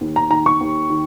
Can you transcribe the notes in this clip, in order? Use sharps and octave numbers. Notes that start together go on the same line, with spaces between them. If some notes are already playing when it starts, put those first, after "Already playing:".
D#2
A#5
D#3 A#5
C#6
D#2
D#3